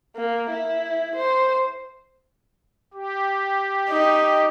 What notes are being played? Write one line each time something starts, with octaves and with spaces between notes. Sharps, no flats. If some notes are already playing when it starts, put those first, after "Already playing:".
A#3
E4
C5
G4
D#4